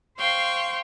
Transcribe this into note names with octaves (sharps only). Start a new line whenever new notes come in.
C5 F5 G5 C6 C#6